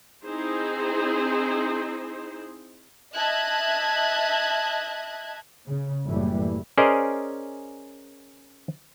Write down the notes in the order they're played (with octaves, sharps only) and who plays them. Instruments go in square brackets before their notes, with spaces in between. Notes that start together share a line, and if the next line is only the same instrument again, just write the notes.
[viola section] C4 D#4 E4 G#4 C5
[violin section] D#5 E5 A5 F#6 G#6
[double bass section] C#3
F#1 A2 E3 G3
[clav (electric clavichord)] C#4 G#4 A#4 C5 D5 D#5